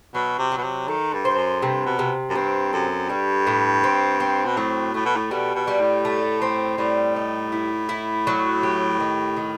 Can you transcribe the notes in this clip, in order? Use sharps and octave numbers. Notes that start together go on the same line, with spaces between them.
B2 F#3
C3
F#3
B2
C3
D#3 A4
G2
C5
F#2
G2 C3
B2
C3
F#2
G2 C4
F#2 A4
G2 G3
A2
C4
C4
B2
A2 F#3
A2 A3
B2
A2
B2 G3
B2
G3
A2
A3
C4
A2 G3
D#4
E4
E4
F#3
G4
D#3
D#3